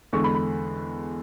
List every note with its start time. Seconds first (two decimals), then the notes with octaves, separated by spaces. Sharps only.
0.13 E2 D3 G#3 C#6
0.24 B5
0.35 B5